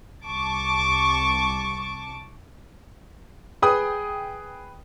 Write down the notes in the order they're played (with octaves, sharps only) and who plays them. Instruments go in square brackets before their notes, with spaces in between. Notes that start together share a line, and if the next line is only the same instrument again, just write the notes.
[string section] C2 A5 C#6 D6
[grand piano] G#4 [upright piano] B4 G5 D#6